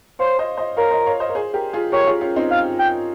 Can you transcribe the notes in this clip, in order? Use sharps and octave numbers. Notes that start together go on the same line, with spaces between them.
C5 C#5 F5
C5 D#5
C5 D#5
A#4 C#5 F5
C5 D#5
C#5 F5
C5 D#5
A#4
G#4 C5
G4 A#4
F4 G#4
G4 A#4 C#5
F4 G#4
C#4 F4
C4 D#4
F5
G5